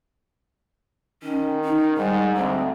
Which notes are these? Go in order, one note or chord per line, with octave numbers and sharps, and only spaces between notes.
D#3 C#4
D#4
G#2 G3
D2 C4